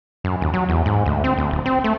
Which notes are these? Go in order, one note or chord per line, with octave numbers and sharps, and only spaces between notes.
F#2
D#2
F#3
E2
G#2
D2
C4
D2
D1
C4
A3